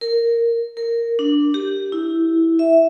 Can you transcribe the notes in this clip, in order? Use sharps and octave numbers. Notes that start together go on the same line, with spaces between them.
A#4
A#4
D4
G4
E4
E5